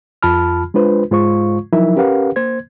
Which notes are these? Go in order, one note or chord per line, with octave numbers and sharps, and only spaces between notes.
F2 F4 A5 B5 F6
G#3 D4 F4 B4 C5
G#2 G#3 F4 C5 F5 C#6
F3 F#3 D#4 E4 A#4 E5
C#4 G4 A#4 B4 F5 F#5
A#3 C5 G#6